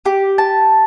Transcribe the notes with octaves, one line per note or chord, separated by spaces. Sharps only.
G4
A5